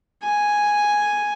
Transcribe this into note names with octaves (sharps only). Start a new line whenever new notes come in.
G#5